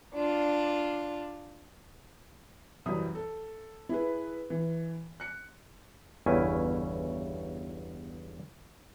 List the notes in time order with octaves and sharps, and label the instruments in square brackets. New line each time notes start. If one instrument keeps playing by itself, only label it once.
[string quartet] D4 F4
[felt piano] C2 F#2 C3 E3 E4 D#6
A4
E4 G#4 B4
E3
F#6 C#7
[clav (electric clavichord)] G1 E2 C#3 C#4 E4 G#5